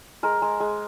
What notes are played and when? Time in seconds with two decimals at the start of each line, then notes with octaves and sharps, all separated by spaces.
0.23 G#3 A#4
0.42 G#3
0.60 G#3